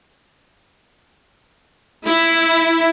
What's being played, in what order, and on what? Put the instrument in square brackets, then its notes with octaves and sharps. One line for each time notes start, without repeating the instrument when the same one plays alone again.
[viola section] E4